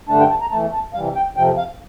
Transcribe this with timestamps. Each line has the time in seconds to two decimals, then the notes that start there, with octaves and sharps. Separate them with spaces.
0.09 G2 D3 A3 D4 A5
0.20 G5
0.30 A5
0.41 A#5
0.51 E2 E3 A3 A5
0.73 A5
0.94 C3 E3 G3 F5
1.15 G5
1.36 F2 C3 F3 G5
1.57 F5